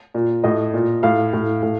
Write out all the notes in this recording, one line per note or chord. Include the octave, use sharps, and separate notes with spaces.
A#2
A2 D#5
A#2
A2 F5
A2
A2